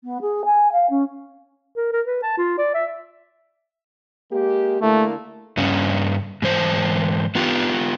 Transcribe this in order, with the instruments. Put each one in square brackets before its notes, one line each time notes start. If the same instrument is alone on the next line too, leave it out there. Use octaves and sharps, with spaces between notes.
[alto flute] B3
G#4
G#5
F5
C#4
[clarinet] A#4
A#4
B4
A5
F4
D5
E5
[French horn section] G#3 A#3 G4
[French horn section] D3 A#3 E4 [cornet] A3
[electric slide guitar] G2 C#3 C#4
G#2 E3 C5
B3 F4 G4